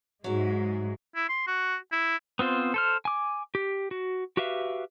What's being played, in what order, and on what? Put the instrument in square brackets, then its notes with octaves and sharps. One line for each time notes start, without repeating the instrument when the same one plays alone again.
[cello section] G#2 G#3 [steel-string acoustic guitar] F#3 E4
[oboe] E4
C6
F#4
E4
[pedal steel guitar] B3 C4 F4 C5
A4 C5 F6
G#5 D6
G4
F#4
F#4 G4 B4 E5 F5